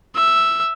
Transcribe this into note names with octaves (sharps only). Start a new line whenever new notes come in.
E5